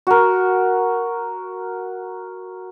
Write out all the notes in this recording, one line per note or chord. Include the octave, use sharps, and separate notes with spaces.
F#4 A#4